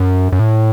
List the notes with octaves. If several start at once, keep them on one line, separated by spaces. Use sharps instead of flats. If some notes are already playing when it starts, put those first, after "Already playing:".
Already playing: F#2
F#2
A2